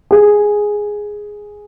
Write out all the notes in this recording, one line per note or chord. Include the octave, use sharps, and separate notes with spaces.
G#4